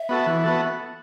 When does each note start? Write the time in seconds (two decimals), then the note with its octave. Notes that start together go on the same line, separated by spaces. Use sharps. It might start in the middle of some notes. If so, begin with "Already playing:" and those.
Already playing: E5
0.09 B3 F#4 A4
0.27 E3
0.44 B3 F#4 A4